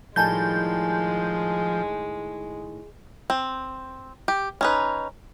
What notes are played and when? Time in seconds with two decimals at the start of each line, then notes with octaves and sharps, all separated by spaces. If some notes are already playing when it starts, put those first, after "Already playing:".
0.16 A2 D#3 F3 G3 G#3 G#5 A5 G6
3.30 C4
4.28 G4
4.61 C#4 D#4 B4